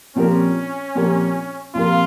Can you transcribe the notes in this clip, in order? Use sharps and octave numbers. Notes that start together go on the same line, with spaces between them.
A#2 F3 C4 C#4 G4 A#4
A#2 F3 C4 G4 A#4
A#2 F3 C4 F4 G4 A#4